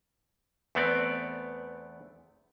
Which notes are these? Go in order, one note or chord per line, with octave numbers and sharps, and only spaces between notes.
E2 A3 B3 C4 D5